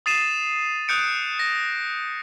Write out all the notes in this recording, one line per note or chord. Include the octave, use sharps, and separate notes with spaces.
D#6 A6 C7 D#7 E7
D#6 F#6 G6 C#7 D7
A#6